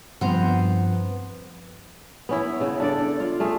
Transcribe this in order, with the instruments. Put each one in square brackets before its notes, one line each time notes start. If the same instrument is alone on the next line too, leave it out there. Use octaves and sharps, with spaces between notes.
[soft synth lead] G2 [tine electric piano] F3 C4 [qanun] B3 C5 A#5
[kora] B3 C#4 E4
C#3 E4
D4 A4 D5
F4 F5
A3 G#4 F5